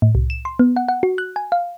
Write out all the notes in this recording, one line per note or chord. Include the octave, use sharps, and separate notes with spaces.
A2
C2
E7
C6
B3
F#5
F#5
F#4
F#6
G#5
F5